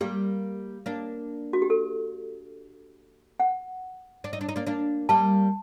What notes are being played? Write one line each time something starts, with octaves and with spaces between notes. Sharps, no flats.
G3 A#3 G4
A#3 D4
F#4
G4
A4
F#5
D4
D#4
D4
D#4
A#3 D4
A#3 D4
G3 A#3 A5